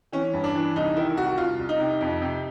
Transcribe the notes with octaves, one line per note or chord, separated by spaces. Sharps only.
E3 C#4
G2
D4
E3
C2 D#4
D#3 E4
C2 F#4
C2 F4
C2
D#4
C3
F2
C3